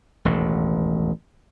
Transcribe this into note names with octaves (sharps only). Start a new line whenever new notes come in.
E1 A1 D#2